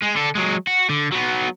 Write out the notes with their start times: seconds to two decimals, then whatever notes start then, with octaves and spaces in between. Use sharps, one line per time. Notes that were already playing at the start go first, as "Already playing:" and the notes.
0.02 G#3
0.16 D3 A4
0.35 F#3 G#3
0.67 F#4
0.89 D3
1.12 F#3 B3